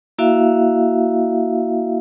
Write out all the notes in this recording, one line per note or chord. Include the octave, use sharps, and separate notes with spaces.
A#3 E4 F#4 E5 F5